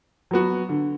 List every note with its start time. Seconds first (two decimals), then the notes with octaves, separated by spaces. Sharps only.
0.31 F#3 B3 F#4
0.69 D3